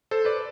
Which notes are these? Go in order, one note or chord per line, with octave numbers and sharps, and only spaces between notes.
A4 C5
B4 D5